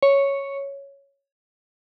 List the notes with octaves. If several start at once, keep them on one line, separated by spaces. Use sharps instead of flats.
C#5